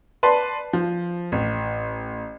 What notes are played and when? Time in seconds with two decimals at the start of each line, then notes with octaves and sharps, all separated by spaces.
0.23 B4 D5 A5 C6
0.73 F3
1.32 A1